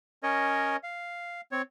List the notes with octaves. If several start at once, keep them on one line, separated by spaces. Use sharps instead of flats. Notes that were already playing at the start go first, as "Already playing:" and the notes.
C#4 A#4 C#5 D#5
F5
C4 C#5